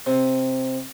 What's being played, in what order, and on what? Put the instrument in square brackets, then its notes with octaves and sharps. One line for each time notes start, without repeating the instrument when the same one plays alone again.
[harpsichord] C3